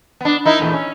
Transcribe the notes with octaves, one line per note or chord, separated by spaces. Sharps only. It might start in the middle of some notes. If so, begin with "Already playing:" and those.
B3 D4
D#4 E4 A#4
E2 A#2 A3
C#4